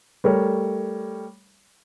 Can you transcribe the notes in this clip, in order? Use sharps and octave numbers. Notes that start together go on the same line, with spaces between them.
G3 A3 A#4 C#5